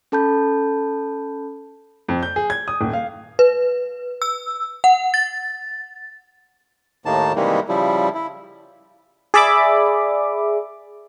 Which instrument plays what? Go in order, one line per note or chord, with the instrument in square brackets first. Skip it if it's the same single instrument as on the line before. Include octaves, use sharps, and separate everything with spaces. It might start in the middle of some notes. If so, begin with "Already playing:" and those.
[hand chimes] C#4 A4 A5 B5 G6
[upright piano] F2
G6
G#4
G#6
D#6
D#1
F5
[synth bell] B4
E6
F#5
A6
[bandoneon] D#2 A2 D#3 A#3 A5
C3 D#3 E3 G3 G#3 A#3
C#3 F3 G3 E4
E4
[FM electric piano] G#4 D5 E5 B5 D6